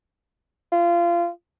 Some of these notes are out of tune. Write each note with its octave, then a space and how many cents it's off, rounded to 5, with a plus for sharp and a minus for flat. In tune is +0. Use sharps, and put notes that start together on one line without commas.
F4 -25